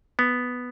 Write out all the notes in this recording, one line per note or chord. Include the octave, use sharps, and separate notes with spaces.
B3